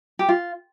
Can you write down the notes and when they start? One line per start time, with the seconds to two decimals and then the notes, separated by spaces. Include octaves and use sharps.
0.19 G4
0.29 F4